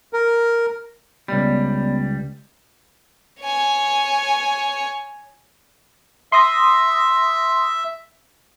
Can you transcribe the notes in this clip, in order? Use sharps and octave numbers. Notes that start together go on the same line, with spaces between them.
A#4
C#2 G3 B3 D5
C#5 G#5
E5 C6 D#6 A#6